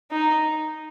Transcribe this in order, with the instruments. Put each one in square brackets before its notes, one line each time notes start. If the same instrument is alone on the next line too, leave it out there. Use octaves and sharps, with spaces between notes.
[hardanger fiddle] D#4